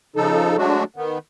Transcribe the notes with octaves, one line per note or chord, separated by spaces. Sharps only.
C#3 F3 D#4 A4
F#3 G#3 A3 D4 F#4
D#3 B3